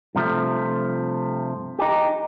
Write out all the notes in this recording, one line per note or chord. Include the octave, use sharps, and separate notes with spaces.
G2 C3 F3 A3
D#4 G4